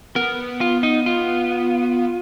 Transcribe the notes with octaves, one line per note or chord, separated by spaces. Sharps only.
B3 A#4
F4
D#4
F4